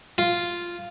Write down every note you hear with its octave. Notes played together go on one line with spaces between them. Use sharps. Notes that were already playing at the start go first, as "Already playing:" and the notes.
F4